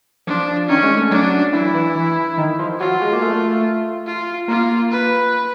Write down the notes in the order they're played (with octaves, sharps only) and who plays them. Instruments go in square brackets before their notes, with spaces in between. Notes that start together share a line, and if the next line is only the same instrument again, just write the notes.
[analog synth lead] F3 [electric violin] D4
[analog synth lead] D#3 [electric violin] C#4
[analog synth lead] G#3
A3
[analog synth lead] F#3 [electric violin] D4
[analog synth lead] E3 [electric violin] E4
[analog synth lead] E3
E3
D#3
F3
[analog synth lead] F#3 [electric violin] F4
[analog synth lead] G#3
A#3
A3
[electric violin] F4
[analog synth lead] A#3 [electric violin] F4
[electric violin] B4